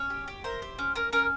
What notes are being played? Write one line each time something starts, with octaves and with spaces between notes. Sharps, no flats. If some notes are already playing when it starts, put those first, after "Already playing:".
Already playing: C#4 C#5
G4
G4
E4 A#4 C5
G4
C#4
C#4 A#4
C#4 A#4